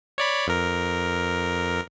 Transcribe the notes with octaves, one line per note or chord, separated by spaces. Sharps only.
C#5 D5 B5
F2 A#4